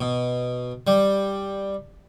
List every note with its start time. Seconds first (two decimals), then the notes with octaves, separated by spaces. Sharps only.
0.01 B2
0.87 G3